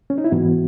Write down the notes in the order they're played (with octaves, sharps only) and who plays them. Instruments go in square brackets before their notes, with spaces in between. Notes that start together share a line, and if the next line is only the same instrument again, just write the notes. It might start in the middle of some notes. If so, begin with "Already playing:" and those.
[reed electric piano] C#4
D#4
E4
G#2 E3 B3 F#4